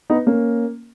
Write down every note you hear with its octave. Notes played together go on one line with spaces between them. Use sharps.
B3 D#4
A#3 C#4